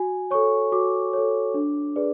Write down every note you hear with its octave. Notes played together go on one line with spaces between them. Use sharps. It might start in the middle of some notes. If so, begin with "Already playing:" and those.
Already playing: F#4 G#5
A4 C#5 C#6
F#4 D6
A4 C#5
D4
G#4 B4 D5